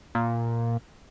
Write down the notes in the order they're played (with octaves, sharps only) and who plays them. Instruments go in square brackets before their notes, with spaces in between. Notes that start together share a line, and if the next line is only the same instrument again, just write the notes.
[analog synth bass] A#2